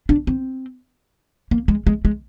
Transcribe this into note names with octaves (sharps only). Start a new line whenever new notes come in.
D4
C4
A#3
G#3
G#3
G#3